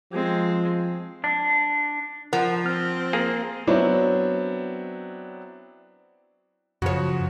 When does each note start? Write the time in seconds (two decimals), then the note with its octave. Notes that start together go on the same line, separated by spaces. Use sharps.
0.12 F3 G#3 C4
1.24 D4
2.33 F3 A#4 F#5
2.66 C4 F6
3.13 A#3 G#4
3.67 F#3 B3 C4 D4 E4
6.82 F#2 C#3 F3 F#4 C#5